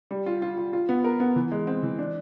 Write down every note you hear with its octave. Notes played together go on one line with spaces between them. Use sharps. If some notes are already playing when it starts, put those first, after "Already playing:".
G3
F4
F4
F4
F4
B3
A#4
B3
E3
G#3
C4
E3
D4